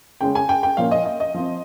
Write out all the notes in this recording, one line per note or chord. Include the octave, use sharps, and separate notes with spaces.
C#3 G#3 C#4 G5
G#5
G5
G5
A#2 F3 A#3 C#4 F5
D#5
D#5
D#5
F3 C4